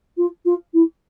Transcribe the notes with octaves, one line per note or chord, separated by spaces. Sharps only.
F4
F4
E4